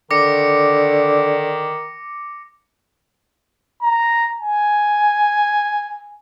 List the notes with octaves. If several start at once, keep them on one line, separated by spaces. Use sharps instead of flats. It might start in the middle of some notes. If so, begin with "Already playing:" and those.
D3 D#3 D6 A#6 C#7
A#5
G#5